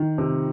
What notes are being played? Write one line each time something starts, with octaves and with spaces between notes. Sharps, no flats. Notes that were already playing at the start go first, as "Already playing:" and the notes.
Already playing: D#3
C3